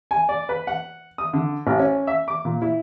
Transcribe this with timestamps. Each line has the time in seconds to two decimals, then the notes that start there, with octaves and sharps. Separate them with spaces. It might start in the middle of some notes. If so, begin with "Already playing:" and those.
0.11 G#5
0.29 D5
0.49 B4
0.67 F#5
1.18 D#6
1.33 D3
1.67 A1
1.79 C#4
2.07 E5
2.28 D6
2.45 A#2
2.62 E4